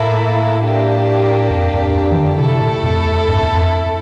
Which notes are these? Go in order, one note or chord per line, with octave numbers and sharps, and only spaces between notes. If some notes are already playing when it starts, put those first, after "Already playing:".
Already playing: A2 A#3 E4 A4 E5
A#3 D4 G4
F2
F2
F2
E3
D3
C3 A3 E4 A4
A#2
F2
E2
G2
F2
E2
F2